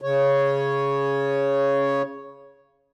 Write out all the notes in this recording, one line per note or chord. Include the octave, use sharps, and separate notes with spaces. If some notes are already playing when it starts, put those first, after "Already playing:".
C#3 C#5